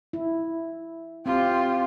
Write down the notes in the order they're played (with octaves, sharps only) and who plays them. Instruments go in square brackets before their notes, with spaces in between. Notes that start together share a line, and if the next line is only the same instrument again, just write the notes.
[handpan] E4
[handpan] C4 [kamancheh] F4 G4